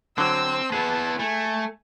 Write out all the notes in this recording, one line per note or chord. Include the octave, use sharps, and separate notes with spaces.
D3 F#3 C4 E6
B3 E4 G#4 A5
A3 G#5